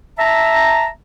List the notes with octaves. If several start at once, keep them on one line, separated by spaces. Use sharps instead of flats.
E5 A5 A#5